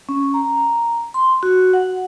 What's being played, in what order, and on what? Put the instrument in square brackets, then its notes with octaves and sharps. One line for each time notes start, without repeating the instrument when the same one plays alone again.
[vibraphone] C#4
A#5
C6
F#4
F#5